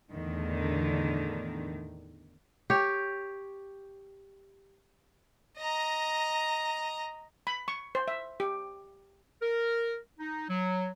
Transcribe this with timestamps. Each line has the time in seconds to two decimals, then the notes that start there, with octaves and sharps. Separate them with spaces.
0.12 E2 A2 D3 D#3
2.70 G4 C#5
5.58 D#5 A#5
7.47 B5
7.68 C#6
7.95 C5
8.08 E5
8.40 G4
9.42 A#4
10.19 D#4
10.49 F#3